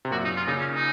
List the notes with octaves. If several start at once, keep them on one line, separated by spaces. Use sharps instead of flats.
C3
F#2 A#2 F#4
D#4
F4
A#2 C#3 D#4
C#4
D#4